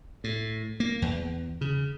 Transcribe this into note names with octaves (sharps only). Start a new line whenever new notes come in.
A2
A#3
E2
C#3